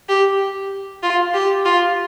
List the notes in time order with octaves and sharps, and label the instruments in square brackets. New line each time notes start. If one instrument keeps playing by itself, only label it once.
[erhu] G4
F4
G4
F4